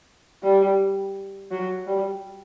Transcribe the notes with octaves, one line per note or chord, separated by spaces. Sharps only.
G3
F#3
G3